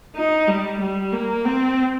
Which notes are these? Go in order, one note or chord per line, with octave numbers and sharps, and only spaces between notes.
D#4
G3
G3
A#3
C4